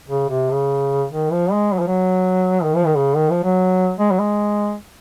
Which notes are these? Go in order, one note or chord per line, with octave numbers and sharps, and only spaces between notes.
C#3
C3
C#3
D#3
F3
G#3
F#3
F3
F#3
D#3
F3
D#3
C#3
D#3
F3
F#3
G#3
F#3
G#3